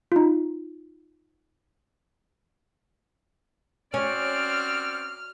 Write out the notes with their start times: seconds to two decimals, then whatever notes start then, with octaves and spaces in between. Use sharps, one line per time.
0.12 D#4 F4
3.94 C4 C#4 F#4 D5 F6